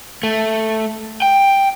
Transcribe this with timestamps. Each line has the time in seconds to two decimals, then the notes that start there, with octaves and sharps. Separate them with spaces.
0.23 A3
1.22 G5